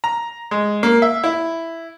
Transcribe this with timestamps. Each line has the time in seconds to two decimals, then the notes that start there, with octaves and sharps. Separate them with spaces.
0.04 A#5
0.51 G#3
0.83 A#3
1.02 E5
1.24 E4